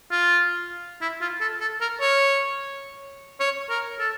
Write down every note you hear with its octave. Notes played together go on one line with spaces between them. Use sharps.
F4
E4
F4
A4
A4
A#4
C#5
C#5
A#4
A4